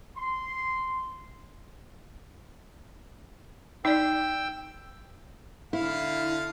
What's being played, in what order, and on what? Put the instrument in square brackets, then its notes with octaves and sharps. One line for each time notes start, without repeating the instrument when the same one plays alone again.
[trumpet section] C6
[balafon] D#4 D5 [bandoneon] G5 E6
[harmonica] D3 F5 [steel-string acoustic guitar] E4